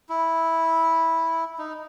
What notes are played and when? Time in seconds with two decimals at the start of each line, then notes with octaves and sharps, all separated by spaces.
0.09 E4
1.59 D#4